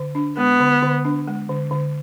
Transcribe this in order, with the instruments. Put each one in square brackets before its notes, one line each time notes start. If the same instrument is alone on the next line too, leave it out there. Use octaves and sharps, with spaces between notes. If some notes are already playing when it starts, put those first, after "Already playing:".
Already playing: [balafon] D3
D4
[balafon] G#3 [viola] B3
[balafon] D3
D3
D4
G#3
D3
D3